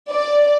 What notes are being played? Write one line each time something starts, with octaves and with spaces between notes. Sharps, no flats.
D5